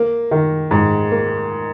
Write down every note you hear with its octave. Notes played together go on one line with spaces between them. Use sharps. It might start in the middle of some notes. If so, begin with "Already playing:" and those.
Already playing: A#3
D#3
G#2
A#3